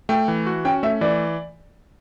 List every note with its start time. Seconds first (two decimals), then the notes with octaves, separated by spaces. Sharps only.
0.09 A3 G5
0.28 E3
0.46 F#4
0.65 C#4 G5
0.83 A3 E5
1.01 E3 D5